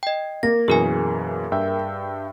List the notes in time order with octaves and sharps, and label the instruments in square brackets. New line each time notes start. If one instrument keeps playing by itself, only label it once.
[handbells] D#5 G5
[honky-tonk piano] A#3 [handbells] A#6
[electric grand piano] F#2 B2 E3 [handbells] G#4 A#4 G#5
[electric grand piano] G2 E5 G5